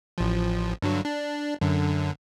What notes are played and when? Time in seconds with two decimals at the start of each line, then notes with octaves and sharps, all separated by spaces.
0.18 A1 F3
0.82 G2 D3 F#3
1.05 D4
1.61 F#2 D3